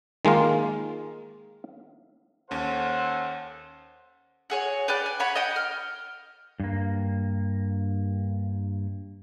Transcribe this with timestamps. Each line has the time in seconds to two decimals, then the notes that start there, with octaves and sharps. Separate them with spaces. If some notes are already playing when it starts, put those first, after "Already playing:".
0.25 D#3 G#3 A#3 F4
2.51 D#2 C#4 A4 C5 F#5
4.50 F#4 G#4 C#5
4.88 B4 D5 G5 F#6
5.06 G#5
5.20 C#5 F#5 B5
5.35 D#5 F#5 G5
5.56 F6
6.60 G2 A#3